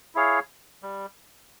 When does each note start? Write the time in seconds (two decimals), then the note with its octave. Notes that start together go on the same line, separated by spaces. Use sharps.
0.15 E4 G#4 C#5 F5
0.83 G3